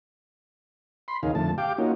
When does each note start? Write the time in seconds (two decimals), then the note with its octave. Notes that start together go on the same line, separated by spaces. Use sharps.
1.08 B5 C6
1.23 D#2 C#3 D#4 G#4 A#4 F5
1.35 F2 D3 A3 A5
1.58 G4 F5 G5 D6
1.78 A#3 C#4 D#4 F4 F#4